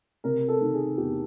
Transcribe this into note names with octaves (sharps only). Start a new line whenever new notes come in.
C3 A#4
A4
D#3
G#4
E2 G4